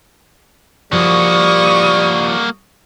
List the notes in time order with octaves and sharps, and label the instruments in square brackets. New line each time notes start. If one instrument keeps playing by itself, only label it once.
[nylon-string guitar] F3 [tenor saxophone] G3 [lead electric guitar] A#3 F#4 [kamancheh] C#6 D#6